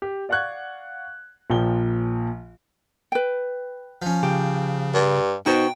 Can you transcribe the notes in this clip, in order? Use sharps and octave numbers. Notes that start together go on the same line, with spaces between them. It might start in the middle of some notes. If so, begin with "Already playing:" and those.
G4
D5 F5 F#5 C#6 F#6 G#6
A#1 A#2 F3 G5 G7
B4 G5
F3 C#4
C#3 G4
G2
B2 D#4 F#4 C5 G5 C#6